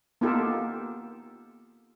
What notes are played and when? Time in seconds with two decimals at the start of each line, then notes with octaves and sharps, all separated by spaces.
0.21 A#3 B3 D#4 F4 G4 A4